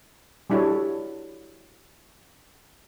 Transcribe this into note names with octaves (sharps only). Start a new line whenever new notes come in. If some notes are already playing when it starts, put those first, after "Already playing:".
G3 D4 E4 F#4 A4 C#5